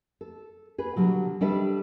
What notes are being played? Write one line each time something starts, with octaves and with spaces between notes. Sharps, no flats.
A4
G#4 B4
B2 D3 D#3 F#3 G3
G3 D4 A4 B4 D5 E5